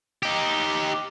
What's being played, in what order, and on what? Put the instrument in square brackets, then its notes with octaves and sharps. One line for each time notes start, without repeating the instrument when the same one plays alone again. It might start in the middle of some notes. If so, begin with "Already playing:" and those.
[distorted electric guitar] D#4 G4